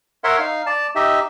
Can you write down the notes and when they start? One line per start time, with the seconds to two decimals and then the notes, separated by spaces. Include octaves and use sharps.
0.24 A#4 C#5 E5 F#5 C6
0.39 D#4 F5
0.66 D5 A5
0.95 D#4 G4 D#5 E5